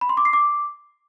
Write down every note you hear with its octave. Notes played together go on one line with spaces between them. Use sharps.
B5
C6
D6
C7
D6